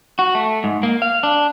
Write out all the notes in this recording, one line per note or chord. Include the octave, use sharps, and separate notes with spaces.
F#4
A3
G#2
A#3
F5
D4